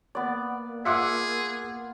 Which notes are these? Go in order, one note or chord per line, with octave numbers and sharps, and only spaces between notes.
A#3 B3 D5
F4 G#4 E5 F#5 D6